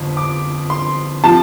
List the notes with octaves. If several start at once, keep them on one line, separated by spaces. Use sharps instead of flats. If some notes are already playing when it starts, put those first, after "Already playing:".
Already playing: G1 F2
D6
C6
C3 F3 A5